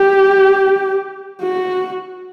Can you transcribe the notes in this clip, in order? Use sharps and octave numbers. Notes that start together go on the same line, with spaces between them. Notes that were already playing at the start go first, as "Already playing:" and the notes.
Already playing: G4
F#4